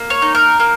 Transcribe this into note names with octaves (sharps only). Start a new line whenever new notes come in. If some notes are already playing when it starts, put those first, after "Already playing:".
Already playing: A#3
C#5
D#4
A#4
A#3